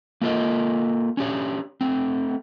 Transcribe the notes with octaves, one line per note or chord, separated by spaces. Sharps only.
A#3 F4 A4 A#4 D#5
C#4 D4 G4 C#5
A3 C4